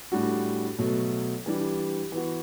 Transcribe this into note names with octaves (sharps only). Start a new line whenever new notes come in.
A2 G3 D4 F#4
B2 F#3 A3
E3 G3 D4 G4
E3 B3 F#4